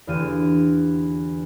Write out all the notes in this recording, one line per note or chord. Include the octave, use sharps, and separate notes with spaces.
E2 D3 F4 G4 D#7